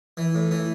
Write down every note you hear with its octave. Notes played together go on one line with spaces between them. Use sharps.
E3
A2
E3